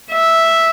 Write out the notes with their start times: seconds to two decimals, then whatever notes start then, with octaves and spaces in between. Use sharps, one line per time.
0.12 E5